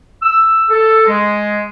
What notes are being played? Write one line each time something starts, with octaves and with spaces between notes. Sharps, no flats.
E6
A4
G#3